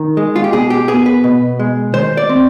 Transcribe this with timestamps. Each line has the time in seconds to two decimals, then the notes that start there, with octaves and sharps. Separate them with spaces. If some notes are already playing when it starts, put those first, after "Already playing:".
Already playing: D#3
0.17 G#3
0.36 F4
0.44 G4
0.53 B2 G#4
0.70 G4
0.88 B3 G#4
1.06 B4
1.24 B2
1.59 G#3
1.94 D#3 C5
2.17 D5
2.29 C4